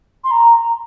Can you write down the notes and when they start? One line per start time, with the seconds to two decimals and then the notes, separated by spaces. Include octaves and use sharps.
0.24 C6
0.31 A#5